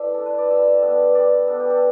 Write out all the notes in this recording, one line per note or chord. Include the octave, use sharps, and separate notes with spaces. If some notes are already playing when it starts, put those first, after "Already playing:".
Already playing: A3 E4 B4 D5 E5
D4 A4
B4
D5
G3 E5
B3 D4 E5
G3 D5
B3 D4 A4
G4
A4